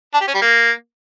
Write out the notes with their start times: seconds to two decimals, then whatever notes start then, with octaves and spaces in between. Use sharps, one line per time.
0.14 D4
0.21 G4
0.28 C#4
0.34 G3
0.41 A#3